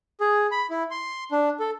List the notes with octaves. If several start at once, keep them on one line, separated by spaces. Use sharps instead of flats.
G#4
B5
E4
C6
D4
A4